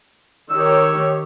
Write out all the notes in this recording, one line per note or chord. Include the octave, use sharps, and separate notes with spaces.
D#3 G4 C#5 E6